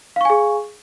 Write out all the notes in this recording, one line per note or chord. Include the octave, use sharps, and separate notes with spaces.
G#4 F5 G#5 C#6